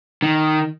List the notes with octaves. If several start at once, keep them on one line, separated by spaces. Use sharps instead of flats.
D#3